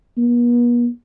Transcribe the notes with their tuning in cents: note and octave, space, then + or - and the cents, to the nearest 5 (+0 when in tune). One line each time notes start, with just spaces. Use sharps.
B3 -45